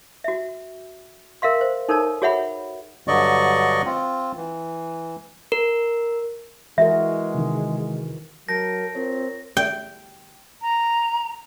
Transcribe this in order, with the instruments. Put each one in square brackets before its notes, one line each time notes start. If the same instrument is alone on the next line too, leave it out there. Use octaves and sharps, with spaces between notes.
[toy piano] F#4 E5
A#4 E5 F5 C6
C5
D#4 A4 A#4 C#5 A5
F#4 G#4 C#5 E5 F#5 B5
[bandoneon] G2 D3 F#3 D5 D#5 C#6
C4 F4
E3
[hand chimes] A#4
[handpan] E3 F#4 A#4 [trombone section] G#3 [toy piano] E5
[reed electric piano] C3 D#3
[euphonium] F#3 [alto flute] A#4 [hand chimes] A5 G6 D7 [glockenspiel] A#6
[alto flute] C4 [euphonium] F4 [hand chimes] A#4 C#5
[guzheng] G5
[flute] A#5